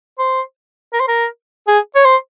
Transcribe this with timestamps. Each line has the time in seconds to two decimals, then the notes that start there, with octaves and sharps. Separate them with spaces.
0.19 C5
0.93 A#4
1.00 C5
1.08 A#4
1.68 G#4
1.95 C#5
2.05 C5